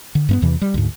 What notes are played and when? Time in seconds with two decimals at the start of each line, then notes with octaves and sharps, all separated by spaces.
0.15 D3
0.29 G2 A#3 B3
0.42 E2 C3 E3
0.61 G3
0.74 D2 G#2